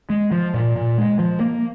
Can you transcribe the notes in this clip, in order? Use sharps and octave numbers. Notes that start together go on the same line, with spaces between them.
G#3
F3
A#2
A#2
G#3
F3
A#3